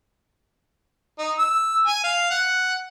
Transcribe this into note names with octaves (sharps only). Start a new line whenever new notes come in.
D#4
E6
G#5
F5
F#5